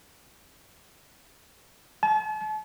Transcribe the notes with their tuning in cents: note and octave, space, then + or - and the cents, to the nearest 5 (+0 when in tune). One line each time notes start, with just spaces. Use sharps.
A5 -40